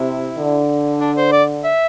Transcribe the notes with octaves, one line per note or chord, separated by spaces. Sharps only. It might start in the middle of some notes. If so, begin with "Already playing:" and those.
Already playing: C3 E4
D3
D4
C5
D5
E5